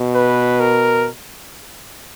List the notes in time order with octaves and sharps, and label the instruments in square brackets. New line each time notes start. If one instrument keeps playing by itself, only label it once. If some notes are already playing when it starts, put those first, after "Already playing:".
Already playing: [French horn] B2
[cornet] B4
A#4